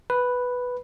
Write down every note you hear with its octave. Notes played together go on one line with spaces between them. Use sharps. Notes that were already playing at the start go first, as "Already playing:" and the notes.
B4